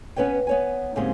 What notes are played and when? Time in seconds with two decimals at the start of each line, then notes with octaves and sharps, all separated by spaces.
0.16 B3 C#4 B4 C#5 G5
0.47 B3 C#5 G#5
0.96 G#2 C#3 G#3 A#3 C4 G4